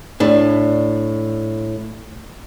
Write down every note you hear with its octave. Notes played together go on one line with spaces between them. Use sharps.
A2 D4